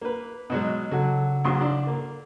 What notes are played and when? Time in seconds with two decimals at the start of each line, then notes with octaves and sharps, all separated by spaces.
0.02 A#3 B4
0.50 B2 F#3 G#3
0.91 C#3 F#3 A4 F#5
1.44 A#1 F#3 C6
1.61 D4
1.87 A#3